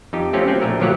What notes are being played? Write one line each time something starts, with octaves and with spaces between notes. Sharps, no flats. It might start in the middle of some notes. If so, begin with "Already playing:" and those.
F2 D#4 G4
A3 C4 C#4 F4 G4
F#3 C4 C#4
A#1 A3 A#4
G1 F3 F#3 G4 C#5 F#5